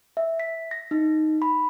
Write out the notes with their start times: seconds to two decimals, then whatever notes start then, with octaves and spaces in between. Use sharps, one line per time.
0.17 E5
0.40 B6
0.71 A#6
0.91 D#4
1.42 B5